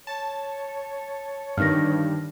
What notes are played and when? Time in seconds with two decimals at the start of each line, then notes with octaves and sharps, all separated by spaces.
0.07 C#5 A5
1.58 G2 D3 D#3 F6 A#6